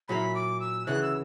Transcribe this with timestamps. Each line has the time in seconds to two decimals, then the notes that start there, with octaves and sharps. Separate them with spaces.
0.08 A#2 F#3 A#3 E4 B5
0.35 D6
0.60 E6
0.86 D2 C#3 E3 F#6
1.02 E6